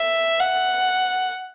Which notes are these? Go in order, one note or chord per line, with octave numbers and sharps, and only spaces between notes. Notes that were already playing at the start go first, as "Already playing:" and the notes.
Already playing: E5
F#5